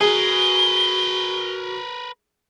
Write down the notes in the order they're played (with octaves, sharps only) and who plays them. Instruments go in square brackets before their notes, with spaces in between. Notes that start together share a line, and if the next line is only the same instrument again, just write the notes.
[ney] F#4 [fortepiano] G#4 [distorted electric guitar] A#4 B4 [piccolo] G7